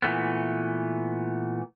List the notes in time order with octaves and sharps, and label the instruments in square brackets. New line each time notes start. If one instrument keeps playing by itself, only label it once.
[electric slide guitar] A#2 E3 A3 B3